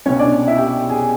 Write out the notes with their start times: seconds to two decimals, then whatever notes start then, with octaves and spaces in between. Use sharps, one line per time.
0.06 C2 B2 C#4 C#5
0.19 D4 D5
0.47 E4 E5
0.58 G4 G5
0.89 G#4 G#5